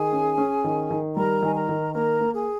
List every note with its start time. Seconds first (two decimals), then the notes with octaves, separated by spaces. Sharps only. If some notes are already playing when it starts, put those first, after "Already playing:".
Already playing: D#3 G#4 G#5
0.12 C#4
0.38 C#4
0.64 D#3
0.90 D#3
1.16 G3 A#4 A#5
1.42 D#3 G#5
1.55 A#4 A#5
1.69 D#3
1.94 A#3 A#4 A#5
2.21 A#3
2.34 G#4 G#5